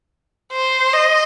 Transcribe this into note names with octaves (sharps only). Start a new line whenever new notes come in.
C5
D#5